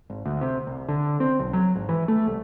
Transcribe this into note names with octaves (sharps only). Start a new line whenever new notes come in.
G#1
D2
C3
C2
D3
C4
B1
F#3
G#1
E3
A3
C2